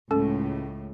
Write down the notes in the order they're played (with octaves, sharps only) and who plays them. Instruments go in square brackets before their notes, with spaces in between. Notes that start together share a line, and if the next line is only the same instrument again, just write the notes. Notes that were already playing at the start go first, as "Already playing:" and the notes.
[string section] C#2 A2 [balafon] C#4 A4